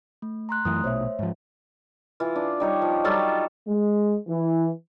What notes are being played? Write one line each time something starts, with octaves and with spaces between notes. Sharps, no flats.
A3
A#5 C6 F#6
F#2 E3 A3 D#6
A#1 B2 C5 C#5 E5
G#2 F3
E3 F4
D4
G3 D#4 C#5
F3
F#3 G3 F4 A4
G#3
E3